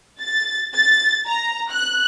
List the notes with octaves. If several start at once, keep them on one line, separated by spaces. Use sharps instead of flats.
A6
A6
A#5
F#6